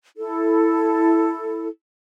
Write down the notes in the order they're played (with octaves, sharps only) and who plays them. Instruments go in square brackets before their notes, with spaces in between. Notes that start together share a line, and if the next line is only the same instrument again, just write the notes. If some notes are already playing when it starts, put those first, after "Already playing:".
[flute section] E4 A4